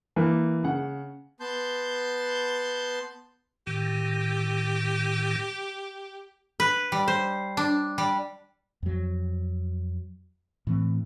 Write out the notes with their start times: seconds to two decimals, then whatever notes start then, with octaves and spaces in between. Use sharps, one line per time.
0.16 E3 A#3
0.63 C#3 F#5
1.40 B3 A5 C6 G6
3.67 A2 D#3 G4
6.60 B4
6.92 G3
7.08 C5
7.57 D4
7.98 G3
8.83 F2 F#3
10.67 A2 E3 C4